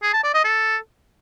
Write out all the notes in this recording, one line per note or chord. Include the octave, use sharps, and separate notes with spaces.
G#4
A5
D5
D#5
A4